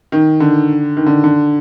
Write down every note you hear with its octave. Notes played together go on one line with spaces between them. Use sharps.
D#3
D3
D#3
D3
D3